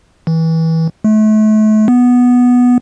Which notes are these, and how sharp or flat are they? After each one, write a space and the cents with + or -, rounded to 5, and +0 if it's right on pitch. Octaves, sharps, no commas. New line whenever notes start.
E3 -25
A3 -35
B3 -5